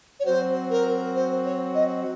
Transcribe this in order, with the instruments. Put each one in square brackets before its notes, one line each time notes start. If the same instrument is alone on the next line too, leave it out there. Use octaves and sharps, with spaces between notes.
[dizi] C#5
[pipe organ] F#3 C4 F#4 [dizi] C5
[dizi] A#4
C5
C#5
D#5